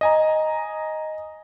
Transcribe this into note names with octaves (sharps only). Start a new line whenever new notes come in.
D#5 G#5 A#5